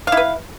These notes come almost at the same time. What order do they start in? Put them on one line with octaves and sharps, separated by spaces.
F5 E4 B4